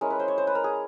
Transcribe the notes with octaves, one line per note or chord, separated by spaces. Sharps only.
G#3 C#4 E4 A#4
B4
C5
C#5
C5
B4
A#4
G#4